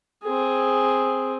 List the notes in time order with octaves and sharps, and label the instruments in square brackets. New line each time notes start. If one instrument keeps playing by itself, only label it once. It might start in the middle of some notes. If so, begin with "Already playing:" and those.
[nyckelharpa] C4 G#4